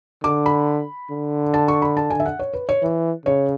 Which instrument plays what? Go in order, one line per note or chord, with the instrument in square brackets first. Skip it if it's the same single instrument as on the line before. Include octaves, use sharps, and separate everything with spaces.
[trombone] D3 [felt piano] D6
[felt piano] B5
[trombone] D3
[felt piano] A5
C#6
B5
A5
G#5
E5
F#5
C#5
B4
C#5
[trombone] E3
[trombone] C#3 [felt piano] C#5